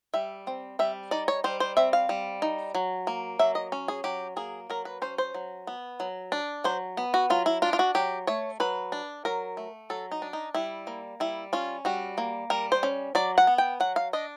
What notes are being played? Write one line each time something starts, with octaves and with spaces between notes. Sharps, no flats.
G3 E5
C4
G3 E5
D#4 D5
C#5
G3 C5
C5
C4 E5
F5
G3
D#4
F#3
A#3
F#3 E5
D#5
C#4
G#4
F#3 G4
A#3 G#4
F#3 A#4
B4
C#4 C5
C5
F#3
B3
F#3
D4
F#3 C5
B3
F#4
F#3 F4
E4
D4 F4
F4
F#4
F#3 G4
A3 C#5
F#3 B4
D4
F#3 A#4
A3
F#3 A4
D#4
D4
D#4
G3 E4
A#3
G3 E4
C#4 F4
G3 F#4
A#3
G3 A#4
C5
C#4
F#3 D5
F#5
B3
G5
F#3 F#5
F5
D4 D#5